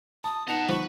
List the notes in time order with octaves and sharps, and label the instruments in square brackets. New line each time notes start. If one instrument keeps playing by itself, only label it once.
[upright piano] A5 [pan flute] D#6
[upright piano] B3 D#4 F7 [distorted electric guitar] D#5 F#5 [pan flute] A5
[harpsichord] F3 [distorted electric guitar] B4 [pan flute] C#6